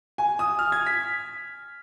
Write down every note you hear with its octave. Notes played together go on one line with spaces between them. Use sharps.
G#5
D#6
F6
G#6
B6